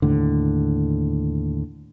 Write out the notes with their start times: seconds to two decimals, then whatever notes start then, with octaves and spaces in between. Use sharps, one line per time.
0.02 D#2 A2 D3